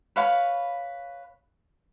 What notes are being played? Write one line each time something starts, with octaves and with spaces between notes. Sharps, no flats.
B4 C#5 F5 B5